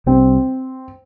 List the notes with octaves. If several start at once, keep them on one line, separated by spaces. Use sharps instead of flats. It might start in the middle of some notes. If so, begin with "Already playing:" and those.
C2 C3 G3 C4